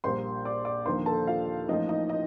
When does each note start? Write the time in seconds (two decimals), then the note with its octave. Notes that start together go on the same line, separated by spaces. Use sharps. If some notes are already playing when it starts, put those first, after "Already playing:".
0.04 A#1 A#2 G3 A#3 C5 C6
0.45 D5 D6
0.65 D5 D6
0.86 D#2 D3 F3 A#3 C5 C6
1.06 A4 A5
1.27 F4 F5
1.68 A1 A2 F3 A#3 D#4 D#5
1.89 D#4 D#5
2.09 D#4 D#5